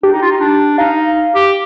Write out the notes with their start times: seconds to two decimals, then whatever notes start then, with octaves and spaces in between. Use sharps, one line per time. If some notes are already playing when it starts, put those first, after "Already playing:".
0.03 D4 G4
0.12 D#4
0.22 F4
0.31 D#4
0.41 D4
0.78 D#4 F5
1.35 G4